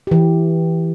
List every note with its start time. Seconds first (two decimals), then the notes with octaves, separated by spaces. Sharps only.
0.07 E3 G4